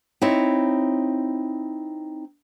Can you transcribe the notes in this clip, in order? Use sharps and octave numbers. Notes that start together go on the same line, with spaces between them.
C4 D#4 E4 C#5